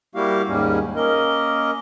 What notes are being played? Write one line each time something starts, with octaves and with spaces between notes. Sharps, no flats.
G3 A#3 E4 F#4 G4 F5
D#2 G#2 G3 C#4
A#3 C#4 A#4 D#5